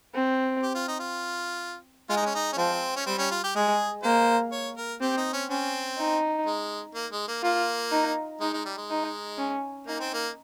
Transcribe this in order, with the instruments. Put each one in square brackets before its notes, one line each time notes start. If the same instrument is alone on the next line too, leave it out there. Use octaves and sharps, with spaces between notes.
[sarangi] C4
[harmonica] G4
F4
D#4
F4
[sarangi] G#3 [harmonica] F4
[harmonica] D#4
C#4
D#4
C#4
[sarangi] F3 [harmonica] C4
[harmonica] C#4
[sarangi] G3 [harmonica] C4
[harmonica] C#4
F4
G4
[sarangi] G#3 [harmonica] G#4
[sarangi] A#3 [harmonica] C5
[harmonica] C#5
A#4
[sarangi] C4 [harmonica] G4
[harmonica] D#4
C#4
[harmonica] C4 [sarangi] C#4
[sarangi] D#4
[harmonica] G#3
A#3
G#3
A#3
[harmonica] A#3 [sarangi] F4
[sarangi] D#4
[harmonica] G#3 [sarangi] D#4
[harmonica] G#3
G3
G#3
[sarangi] D#4
C#4
[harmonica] A#3 [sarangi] D#4
[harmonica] C4
A#3